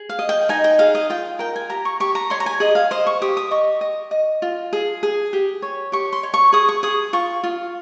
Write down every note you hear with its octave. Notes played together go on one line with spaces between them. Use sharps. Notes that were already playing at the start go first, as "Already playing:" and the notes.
Already playing: G#4
F5
D#5
G5
D#4 G#5
G5
G#4 F5
D#5
F4 G5
A#4 G5
G#5
G4 A#5
C#6
G4 C#6
A#5
C#5 C6
A#5
G#5
G#4 D#5
F5
C5 D#5
C#6
G4 D#6
D#6
D#5 C#6
D#5
D#5
F4
G#4
G#4
G4
C#5
G4 C#6
C6
C#5
C#6
G#4 D#6
C#6
G#4 D#6
F4 C#6
F4